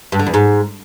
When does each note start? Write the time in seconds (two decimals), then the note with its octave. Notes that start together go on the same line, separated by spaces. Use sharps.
0.12 G2
0.19 D3
0.27 E2
0.34 G#2